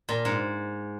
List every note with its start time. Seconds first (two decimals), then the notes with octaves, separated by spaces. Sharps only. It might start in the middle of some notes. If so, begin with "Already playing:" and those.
0.09 A#2
0.25 G#2